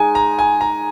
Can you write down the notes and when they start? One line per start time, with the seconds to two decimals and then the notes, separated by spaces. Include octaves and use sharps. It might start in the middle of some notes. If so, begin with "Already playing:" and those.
Already playing: G#3 D#4 G#5
0.15 A#5
0.39 G#5
0.61 A#5